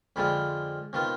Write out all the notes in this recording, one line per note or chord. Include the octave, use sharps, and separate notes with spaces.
F2 D3 G#3 C4 F4 B5
C3 D#3 B3 F4